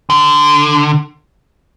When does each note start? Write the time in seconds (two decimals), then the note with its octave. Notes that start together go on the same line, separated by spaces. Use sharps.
0.10 D3